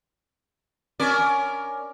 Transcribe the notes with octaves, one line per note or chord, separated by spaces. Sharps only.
C#4 A#4 D5